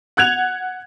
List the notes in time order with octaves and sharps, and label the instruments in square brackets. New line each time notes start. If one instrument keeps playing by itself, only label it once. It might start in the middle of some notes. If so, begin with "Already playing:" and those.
[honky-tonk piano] F#5 F#6 G#6 F7